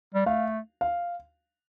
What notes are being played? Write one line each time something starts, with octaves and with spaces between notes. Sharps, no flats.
G3
A3 F5
F5